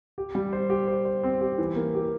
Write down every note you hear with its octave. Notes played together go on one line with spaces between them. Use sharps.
G4
G3
C5
G4
C5
C5
C4
G4
E3
A#3
G4